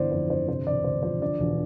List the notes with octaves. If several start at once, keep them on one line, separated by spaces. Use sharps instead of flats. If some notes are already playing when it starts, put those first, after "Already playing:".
Already playing: G1 E3 B3 C5 D5
F2 C5
G1 C5
C3 C5
E1 D5
D2 C5
F3 C5
D3 D5
E1